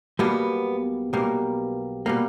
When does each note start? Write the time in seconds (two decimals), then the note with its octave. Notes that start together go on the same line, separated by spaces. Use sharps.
0.19 B1 B2 G3 A#3 B3
1.13 B1 B2 G3 A#3
2.06 B2 G3 A#3